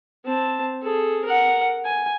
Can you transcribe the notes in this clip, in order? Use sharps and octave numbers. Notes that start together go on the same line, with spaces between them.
C4 A5
G#4 A4
A#4 F#5
G#5